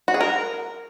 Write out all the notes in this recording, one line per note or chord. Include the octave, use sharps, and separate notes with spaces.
F#4
G#4
A#4